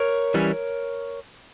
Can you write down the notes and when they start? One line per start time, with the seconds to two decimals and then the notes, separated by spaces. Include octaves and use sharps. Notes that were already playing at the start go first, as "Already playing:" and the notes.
Already playing: A#4 C#5
0.34 E3 G3 C#4